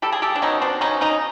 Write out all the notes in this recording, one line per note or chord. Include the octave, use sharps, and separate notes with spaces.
G3 G4 A4
G#4
G4 A4
D4
B2 C#4 D#4
C4 D4
B2 C#4 D#4
C#4 D#4